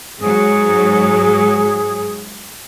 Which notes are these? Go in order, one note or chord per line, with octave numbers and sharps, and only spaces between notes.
G#2 F#3 G#4